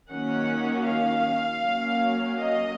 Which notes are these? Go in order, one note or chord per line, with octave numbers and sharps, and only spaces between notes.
D#3 F#3 A#3 C#4 F#5
F5
F#3 A#3 C#4
D#5